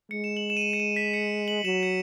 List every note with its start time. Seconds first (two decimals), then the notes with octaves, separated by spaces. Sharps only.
0.11 G#3 C#7
0.24 E7
0.37 F#7
0.50 E7
0.57 D#7
0.62 E7
0.73 C#7
0.80 D#7
0.96 B6
1.14 C#7
1.48 F#7
1.65 F#3 E7
1.83 C#7